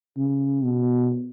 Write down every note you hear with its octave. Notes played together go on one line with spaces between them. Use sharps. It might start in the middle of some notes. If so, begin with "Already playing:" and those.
C#3
B2